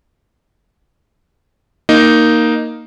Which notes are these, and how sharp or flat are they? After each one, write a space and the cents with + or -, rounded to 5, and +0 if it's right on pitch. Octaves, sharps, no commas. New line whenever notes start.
A#3 +0 D#4 +0